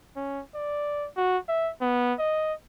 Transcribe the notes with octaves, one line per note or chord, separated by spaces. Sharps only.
C#4
D5
F#4
E5
B3
D#5